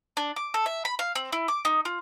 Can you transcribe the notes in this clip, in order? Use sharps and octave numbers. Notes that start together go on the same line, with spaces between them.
D4
D6
A4
E5
B5
F5
C4
E4
D6
D#4
F4